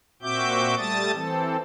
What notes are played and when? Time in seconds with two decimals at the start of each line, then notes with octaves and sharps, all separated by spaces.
0.22 A#2 C4 F#4 E5 D6 G6
0.78 G3 A3 A5 D#6 A6
1.13 E3 C4 A4